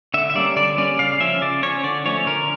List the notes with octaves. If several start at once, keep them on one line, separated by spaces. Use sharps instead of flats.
D3 E5
E5
G3 A#3 C#4 D5
D3 D5
G3 A#3 C#4 D5
C#3 F5
F3 C#4 E5
C#3 D5
F3 C#4 C#5
D3 D5
F3 A3 C#4 C#5
D3 A#4